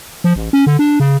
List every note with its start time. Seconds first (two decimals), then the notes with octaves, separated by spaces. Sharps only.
0.24 F3
0.36 A1
0.53 C#4
0.67 D3
0.79 D4
1.00 C#3